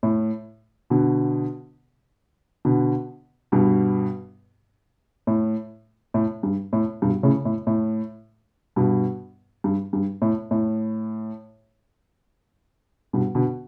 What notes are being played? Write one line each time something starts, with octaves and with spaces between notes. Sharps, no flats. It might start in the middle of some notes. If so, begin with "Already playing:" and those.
A2
B2 D3
B2 D3
G2 B2
A2
A2
G2
A2
G2 B2
A2 C#3
A2
A2
G2 B2
G2
G2
A2
A2
G2 B2
B2 D3